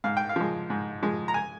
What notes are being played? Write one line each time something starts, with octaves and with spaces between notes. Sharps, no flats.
G#2 F5
G5
F5
F3 G#3
G#2
F3 G#3
A#5
G#5